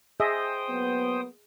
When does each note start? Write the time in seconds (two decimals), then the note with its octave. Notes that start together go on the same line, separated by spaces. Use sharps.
0.20 G#4 C5 D#5 E5 G5 D#6
0.69 F#3 A#3 B3